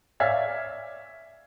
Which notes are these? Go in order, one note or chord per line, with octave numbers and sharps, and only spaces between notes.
C#5 D5 E5 F5 G#6